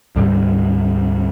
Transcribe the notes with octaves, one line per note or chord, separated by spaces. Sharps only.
D2 G#2 D3 G3